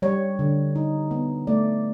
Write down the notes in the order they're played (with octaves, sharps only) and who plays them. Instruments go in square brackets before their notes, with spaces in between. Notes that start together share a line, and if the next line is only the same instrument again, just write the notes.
[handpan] G3 C#5
D3
D#4
B3
A3 D5